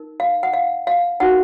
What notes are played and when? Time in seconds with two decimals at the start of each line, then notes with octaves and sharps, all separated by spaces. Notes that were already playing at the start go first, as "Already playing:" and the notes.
Already playing: D#4 A#4
0.20 F5
0.43 F#5
0.54 F5
0.87 F5
1.20 D#4 F#4 A#4 F#5